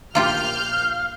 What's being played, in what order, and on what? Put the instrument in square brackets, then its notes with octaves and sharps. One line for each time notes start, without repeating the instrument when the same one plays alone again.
[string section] A#1 F6 G6 [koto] A#3 F4 G4 [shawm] F5